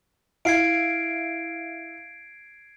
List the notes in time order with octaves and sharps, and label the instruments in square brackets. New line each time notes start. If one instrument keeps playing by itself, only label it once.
[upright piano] E4 F5 [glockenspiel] G#6 C7 D7